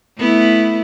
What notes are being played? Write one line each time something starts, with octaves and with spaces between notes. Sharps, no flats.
A3 B3 E4